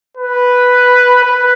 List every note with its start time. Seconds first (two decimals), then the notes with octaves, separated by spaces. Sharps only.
0.17 B4
1.24 B4